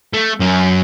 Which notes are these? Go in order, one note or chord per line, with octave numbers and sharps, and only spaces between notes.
A3
F#2